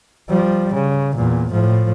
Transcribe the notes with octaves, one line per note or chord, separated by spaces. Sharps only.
F3 G3
C#3
E2 A#2
A2 F3